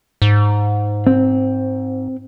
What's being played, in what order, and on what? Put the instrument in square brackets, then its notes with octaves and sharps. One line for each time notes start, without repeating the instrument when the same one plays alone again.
[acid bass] G#2
[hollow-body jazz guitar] C4